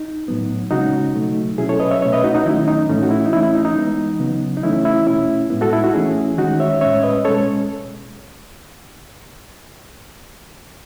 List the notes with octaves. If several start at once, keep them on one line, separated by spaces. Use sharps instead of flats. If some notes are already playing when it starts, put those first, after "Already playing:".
Already playing: D#4
A2 F#3 B3
C#3 G#3 C#4 D#4 F#4
B2 F#3 A3
B2 F#3 C#4 E4 G#4
A4 C#5
B4 D#5
C#5 E5
B2 A3 C#4 C#5 E5
B4 D#5
D#4 F#4
D#4 F#4
D#3 F#3 A3 C#4 E4
D#4
D#4
A2 E3 A3 C#4 D#4
F#4
E4
D#4
E3 A3 C#4 E4
E4
D#4
D#4
E3 G#3 B3
C#3 F#3 B3
D#4
E3 A3 C#4 E4
E4
B2 A3 C#4 E4
A2 G#3 B3 E4
F#4 A4
E4
D#4 F#4
E3 A3 C#4 E4 G#4
D#3 G#3 C#4 D#4 F#4
C#5 E5
A2 G#3 C#4 C#5 E5
B4 D#5
B2 G#3 C#4 A4 C#5